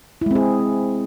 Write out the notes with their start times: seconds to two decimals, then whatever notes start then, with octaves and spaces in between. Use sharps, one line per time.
0.21 E4
0.26 G#3
0.31 C4
0.35 G#4